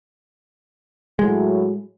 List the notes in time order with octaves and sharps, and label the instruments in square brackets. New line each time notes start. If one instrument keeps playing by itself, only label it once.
[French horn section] A2 F#3 [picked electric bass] G#3